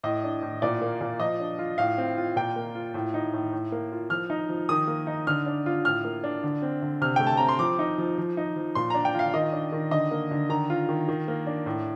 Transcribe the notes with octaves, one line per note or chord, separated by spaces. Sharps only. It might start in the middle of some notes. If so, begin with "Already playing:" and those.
A2 D#5
D4
A2
A#2 D5
A#3
A#2
F3 D#5
D4
F4
A2 F5
C4
F4
A#2 G5
A#3
F4
A2
D#4
A2
A2
A#3
F4
F3 F6
D#4
F3
D#3 D#6
A#3
D#4
D3 F6
D4
F4
A2 F6
A#3
D4
D3
C4
D3
C3 F6
A3 G5
A5
C4 A#5
C6
F3 D6
D#4
F3
F3
D#4
F3
A#2 C6
D4 A#5
G5
F4 F5
D#3 D#5
D4
D#3
D3 D#5
A#3
D3
D#3 A#5
F4
D#3
D#3
A#3
D4
A2